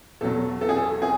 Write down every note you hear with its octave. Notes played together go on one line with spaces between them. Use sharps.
E2 B2 F#3 A4
A4
G#4
A4
G#4